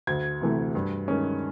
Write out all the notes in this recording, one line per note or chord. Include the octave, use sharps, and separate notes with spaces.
D2 G#6
C3 E3 A3
G2
D#3 G#3 C#4